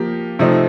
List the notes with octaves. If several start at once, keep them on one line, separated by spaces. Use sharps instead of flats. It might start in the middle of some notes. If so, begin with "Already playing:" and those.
Already playing: F3 A#3 G4
C3 F3 A3 C4 D#4